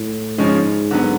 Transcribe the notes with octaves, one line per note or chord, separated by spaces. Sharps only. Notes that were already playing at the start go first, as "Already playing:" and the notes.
Already playing: A2
G#2 C#3 F3 G#3 C#4
D3 F#3 B3